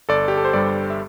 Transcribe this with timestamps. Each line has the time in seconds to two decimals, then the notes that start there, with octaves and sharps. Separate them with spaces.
0.09 G1 A4 D5
0.28 G4
0.37 A4
0.45 C5
0.53 G2 G3 A4 D5
0.90 E5